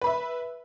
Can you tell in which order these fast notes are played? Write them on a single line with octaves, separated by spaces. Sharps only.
B4 B5 E5